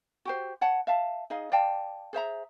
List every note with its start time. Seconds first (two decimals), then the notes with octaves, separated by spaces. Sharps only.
0.25 F#4 G4 C5
0.61 C#5 F#5 A5
0.87 E5 F5 A5
1.30 D#4 G#4 D#5 F5
1.52 D5 F5 G5 A5
2.13 G#4 C5 E5 A#5